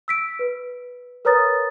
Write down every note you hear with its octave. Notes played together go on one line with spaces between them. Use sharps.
E6 B6 D7
B4
A#4 B4 C#5 A#5 D#6 A6